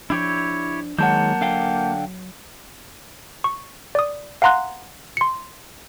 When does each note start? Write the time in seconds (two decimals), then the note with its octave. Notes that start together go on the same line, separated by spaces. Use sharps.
0.10 F3 D4 E4 G4 C#5
0.99 D#3 F#3 G#3 A#3 C#5 F#5 A5 G6
1.41 D3 F5 G5
3.44 C#6
3.95 D5 D#6
4.42 F5 F#5 A#5 C6 F#6
5.17 C6 C#7